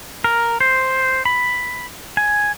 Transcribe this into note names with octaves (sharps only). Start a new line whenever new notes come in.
A#4
C5
B5
G#5